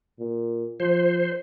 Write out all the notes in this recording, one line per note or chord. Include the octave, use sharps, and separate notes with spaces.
A#2
F3 C5